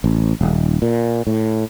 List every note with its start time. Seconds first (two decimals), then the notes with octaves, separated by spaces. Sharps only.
0.04 A1
0.41 D#1
0.82 A#2
1.27 A2